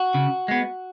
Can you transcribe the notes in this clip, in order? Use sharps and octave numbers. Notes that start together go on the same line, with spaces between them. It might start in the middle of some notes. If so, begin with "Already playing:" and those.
Already playing: F#4
C#3
G#3 B3